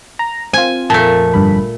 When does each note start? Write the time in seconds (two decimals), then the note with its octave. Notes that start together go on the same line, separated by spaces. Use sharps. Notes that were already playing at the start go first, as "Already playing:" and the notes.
0.19 A#5
0.53 C4 F4 G#5
0.90 F2 A#2 A3 A5
1.34 G1 G2 B5